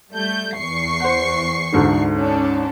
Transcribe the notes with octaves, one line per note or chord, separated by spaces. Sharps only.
G3 A3 G6
E2 C#6 C7
C5 F#5
D2 G#2 D3
C#4 D4